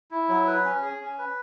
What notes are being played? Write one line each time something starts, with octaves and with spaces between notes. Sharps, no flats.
E4
F#3
B4
C#4
G#4
C#4
B4